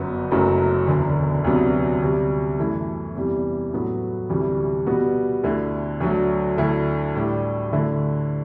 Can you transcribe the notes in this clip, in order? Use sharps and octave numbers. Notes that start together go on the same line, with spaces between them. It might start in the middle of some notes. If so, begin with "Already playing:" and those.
Already playing: G1 F#2 F#3 B3
F#1 F#2 F#3 A3
E1 D2 D3
D2 C3 F#3 B3 D4
D2 C3 G3
F#2 E3 A3 E4 A4
E2 C3 E3 G3
A2 F#3 B3 F#4 A4
D2 C3 E3 G3
B2 G3 B3 F#4
D2 D3 A3 E4
D2 D3 F#3 A3
D2 D3 A3 E4
A2 G3 D4 G4
D2 D3 A3 E4